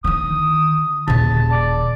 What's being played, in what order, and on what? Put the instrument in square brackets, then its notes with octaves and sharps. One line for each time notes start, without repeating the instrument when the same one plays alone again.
[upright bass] D3 D#3 [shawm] D#6
[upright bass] D#1 C#3 [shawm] A5
[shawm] D5